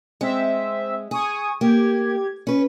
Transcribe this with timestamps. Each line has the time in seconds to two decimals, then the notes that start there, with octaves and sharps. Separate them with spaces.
0.21 G#3 C4 E5
1.11 G#4 G#5 C#6 D#6
1.61 A#3 G4 G#6
2.47 C#4 B4